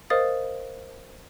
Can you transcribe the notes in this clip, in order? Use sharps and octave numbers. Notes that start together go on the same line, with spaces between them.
A#4 C5 D#5 F5 D#6 A6